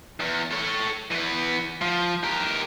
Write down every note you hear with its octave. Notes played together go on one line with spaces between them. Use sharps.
E2
A4 C#5
E3 B3
F3
G4 A#4